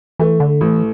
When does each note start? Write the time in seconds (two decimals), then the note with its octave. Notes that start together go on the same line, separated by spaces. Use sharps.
0.19 E3 A3
0.40 D3
0.61 A1 E3